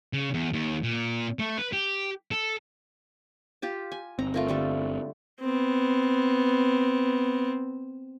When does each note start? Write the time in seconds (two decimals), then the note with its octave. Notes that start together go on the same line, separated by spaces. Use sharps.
0.13 C#3
0.34 E2
0.53 D#2
0.83 A#2
1.39 A3
1.58 B4
1.73 G4
2.31 A4
3.62 F4 G4 A5
3.92 G#5
4.19 G1 C4 A#5
4.34 A3 F4 A#4
4.48 D3 G3 A4
5.41 B3 C4